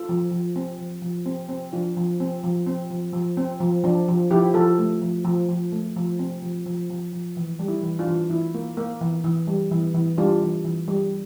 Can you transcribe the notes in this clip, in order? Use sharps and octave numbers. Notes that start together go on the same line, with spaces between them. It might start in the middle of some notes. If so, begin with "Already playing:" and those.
Already playing: F4 A4
F3
F3
C4
F3
F3
C4
C4
F3 D4 F4
F3
C4
F3
C4
F3
F3
C4
F3
F3 D4
F3
F3 E4 G4
F3 F4 A4
A3
F3
F3
F3
A3
F3
C4
F3
F3
F3
F3
E3
G3
E4
E3
D4 F4
E3
E3 E4
A#3
A#3
E3
E3
G3
E3
E3
G3 D4 F4
E3
E3
G3